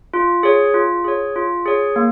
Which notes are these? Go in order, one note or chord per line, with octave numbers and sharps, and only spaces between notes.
F4
G#4 C#5
F4
G#4 C#5
F4
G#4 C#5
A#3